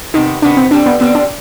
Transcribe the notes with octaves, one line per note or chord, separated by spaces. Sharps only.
C3 D#3 B3 D#4
C3 D#3 B3 D4
C4
D3 G3 C4 D4
B3
D3 G3 B3 C4
D4